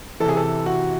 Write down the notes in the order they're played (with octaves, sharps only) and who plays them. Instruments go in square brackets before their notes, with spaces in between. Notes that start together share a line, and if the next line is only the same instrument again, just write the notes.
[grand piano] E3 A4
C3 G#4
A4
F#4